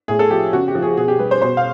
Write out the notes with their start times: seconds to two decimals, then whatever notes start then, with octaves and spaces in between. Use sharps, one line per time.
0.08 A2 G#4
0.19 A4
0.30 F3 G4
0.53 C#3 F#4
0.68 G4
0.75 F3
0.82 G#4
0.97 B2 G#4
1.08 G4
1.19 G3 B4
1.31 C5
1.42 B2 C5
1.57 F5